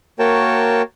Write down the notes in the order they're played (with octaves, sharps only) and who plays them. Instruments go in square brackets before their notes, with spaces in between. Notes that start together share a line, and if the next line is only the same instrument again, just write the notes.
[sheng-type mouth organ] A#3 F#4 A#4 C#5 G5 A5